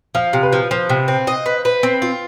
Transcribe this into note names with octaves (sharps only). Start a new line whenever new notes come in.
F3 F5
C3
B4
F3
F3 C5
C3
C4
D#5
B4
B4
C4
F4